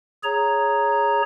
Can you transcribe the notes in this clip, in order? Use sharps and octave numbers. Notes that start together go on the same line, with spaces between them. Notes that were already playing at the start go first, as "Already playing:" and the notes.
G#4 C#5 A#5